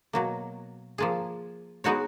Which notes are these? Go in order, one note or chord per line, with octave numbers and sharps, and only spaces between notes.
B2 F#3 A#3
F3 A#3 F4 G#4
G#3 B3 D#4 F#4 C#5